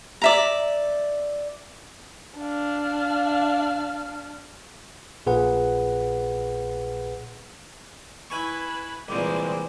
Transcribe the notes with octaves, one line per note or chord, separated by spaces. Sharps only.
D5 E5 A#5
D4 F5
A#1 A#2 G#4 B4 F#5
E4 B4 G#5 C#6
C2 A#2 E3 G#3 C4 G4